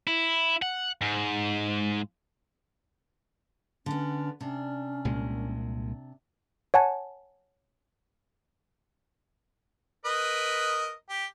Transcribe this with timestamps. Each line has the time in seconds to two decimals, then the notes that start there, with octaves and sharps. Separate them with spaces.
0.07 E4
0.62 F#5
1.02 G#2
3.86 D3 B3 C#4
4.41 C3 C#4 D4
5.05 C2 A#2 G#3
6.74 C#5 F#5 G#5 A5
10.05 A#4 B4 D#5
11.10 G4